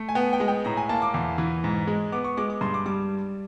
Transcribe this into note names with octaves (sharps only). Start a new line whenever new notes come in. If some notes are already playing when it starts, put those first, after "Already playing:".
Already playing: A3
G#5
B3 G5
G5
G#3
G5
A2 A#5
G#5
A#3 A5
D6
E2
E3
G#2
G#3
B3 D6
C#6
G#3 D6
D6
G2 C6
D6
G3 D6